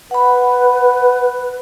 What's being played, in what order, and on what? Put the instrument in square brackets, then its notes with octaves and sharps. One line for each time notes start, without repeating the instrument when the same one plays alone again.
[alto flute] B4 [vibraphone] F#5 B5